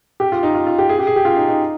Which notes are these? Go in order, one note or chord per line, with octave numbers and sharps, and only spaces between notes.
G4
F4
D#4
F4
F4
G4
G#4
G4
G#4
G4
F4
D#4
D#4